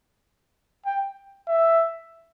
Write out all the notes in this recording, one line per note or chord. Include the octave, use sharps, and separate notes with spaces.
G5
E5